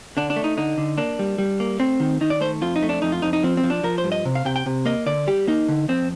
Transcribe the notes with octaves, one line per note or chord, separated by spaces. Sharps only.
D3 D4
D4
A3
D#4
D3 D#4
D3
A#3 D4
G3
G3
A#3
A3 C4
D#3
D#3 D#4
D5
A3 C5
F2 F4
D#4
A3
D4
F2 D#4
F4
F2 D#4
D#4
F3 C4
C4
F3
D4
F3 A#4
C5
G2
D#5
C3
F5
C3 G5
G5
C3
A#3 D#5
D3 D5
G3 G4
A#3 D#4
D3
F2 C4